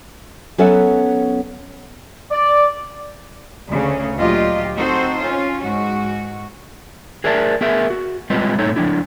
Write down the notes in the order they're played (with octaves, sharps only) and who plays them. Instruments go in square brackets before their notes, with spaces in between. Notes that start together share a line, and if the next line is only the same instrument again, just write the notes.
[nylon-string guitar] F#3 B3 C#4 A4 B4 E5
[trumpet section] D5
[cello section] D2 C#3 C#4
D2 A#2 F#3 F4 G4 D#5
C4 D#4 F#4 A4 C5
C#4 F4
G#2 F#4
[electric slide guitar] G#4 A#4 D5 E5 F#5 A5
B3 G#4 A#4 E5
F#4
G3 G#3 C4 F4 B4 D#5
A2 D#4 A4 C#5
F3 D4 E4